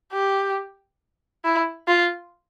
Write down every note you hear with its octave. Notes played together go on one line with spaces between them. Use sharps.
G4
E4
F4